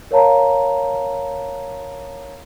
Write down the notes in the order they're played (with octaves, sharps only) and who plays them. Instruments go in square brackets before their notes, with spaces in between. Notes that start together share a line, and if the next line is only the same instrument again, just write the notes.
[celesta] A#4 C#5 F5 A5 A#5